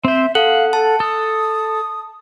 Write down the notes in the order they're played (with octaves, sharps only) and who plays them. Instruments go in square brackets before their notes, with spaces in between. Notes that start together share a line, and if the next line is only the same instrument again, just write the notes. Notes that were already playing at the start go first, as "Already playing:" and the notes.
[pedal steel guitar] C4 C5 [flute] E5
[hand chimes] A4 [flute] F5 [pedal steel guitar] F#5
[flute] A4 [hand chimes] A5
[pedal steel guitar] A4 [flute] D#6